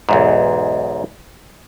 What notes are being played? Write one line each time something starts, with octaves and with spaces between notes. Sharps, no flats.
B1 E2 G#2